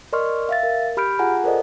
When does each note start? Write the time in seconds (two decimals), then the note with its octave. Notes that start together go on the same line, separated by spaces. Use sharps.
0.13 A#4 D5 D#5 C6 C#6 F6
0.49 E5 F5 A6
0.63 A#4
0.97 G4 B5 F6 G6 D7
1.19 F4 G#4 F#5 G#5 A#5
1.44 A4 A#4 C5 D5 D#5